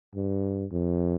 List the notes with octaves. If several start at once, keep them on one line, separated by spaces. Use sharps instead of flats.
G2
F2